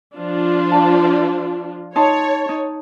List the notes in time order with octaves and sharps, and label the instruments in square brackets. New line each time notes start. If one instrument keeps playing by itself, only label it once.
[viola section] F3 D4 F4
[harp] A5
[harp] D#4 A5 C6 [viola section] C#5
[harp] D#4